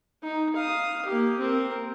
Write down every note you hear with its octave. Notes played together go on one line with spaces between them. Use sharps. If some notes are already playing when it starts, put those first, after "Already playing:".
D#4
F5 D#6
A#3 G4
C4 A#4